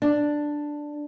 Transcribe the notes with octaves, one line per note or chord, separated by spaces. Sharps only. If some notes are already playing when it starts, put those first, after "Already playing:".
D4